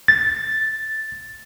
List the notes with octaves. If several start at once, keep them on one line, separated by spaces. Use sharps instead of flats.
A6